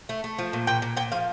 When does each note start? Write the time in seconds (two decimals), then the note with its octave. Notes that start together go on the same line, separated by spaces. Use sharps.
0.09 A3
0.24 A3
0.38 F3
0.53 A#2
0.67 A#2 G5
0.82 A#2
0.96 A#2 G5
1.12 F3 F5